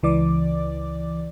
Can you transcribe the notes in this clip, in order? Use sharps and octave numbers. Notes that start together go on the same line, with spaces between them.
C#2 E3 D5 D6